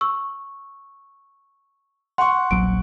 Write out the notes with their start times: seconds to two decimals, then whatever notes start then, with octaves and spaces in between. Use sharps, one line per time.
0.01 C#6 E6
2.18 F#5 C6 C#6
2.51 D#1 A#1 F#3 D7